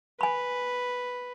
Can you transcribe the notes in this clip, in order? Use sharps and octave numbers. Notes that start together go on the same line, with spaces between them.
B4 G#5 B5